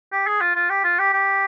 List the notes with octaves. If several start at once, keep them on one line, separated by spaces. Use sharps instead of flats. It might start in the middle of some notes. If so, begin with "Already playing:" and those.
G4
G#4
F4
F4
G4
F4
G4
G4